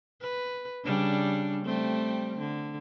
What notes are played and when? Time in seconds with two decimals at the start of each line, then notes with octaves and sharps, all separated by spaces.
0.21 B4
0.84 C#3 G3 D4
1.65 G3 A3 C4
2.38 D3